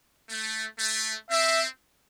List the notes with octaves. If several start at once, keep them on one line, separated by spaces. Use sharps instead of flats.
A3
A3
C4 E5